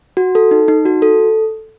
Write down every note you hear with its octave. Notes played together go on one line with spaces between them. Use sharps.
F#4
A4
D#4
D#4
F#4
A4